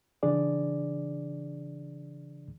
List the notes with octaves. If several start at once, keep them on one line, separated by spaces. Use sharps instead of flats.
C#3 E3 D4 G#4 D5